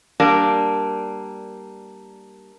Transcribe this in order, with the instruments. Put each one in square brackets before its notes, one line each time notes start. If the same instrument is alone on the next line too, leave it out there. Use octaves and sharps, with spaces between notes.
[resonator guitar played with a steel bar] G3 A#3 D4